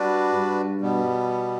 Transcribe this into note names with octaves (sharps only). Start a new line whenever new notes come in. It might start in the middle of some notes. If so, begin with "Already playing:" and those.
Already playing: G3 D4 F#4 B4 D5
G2
B2 G3 B3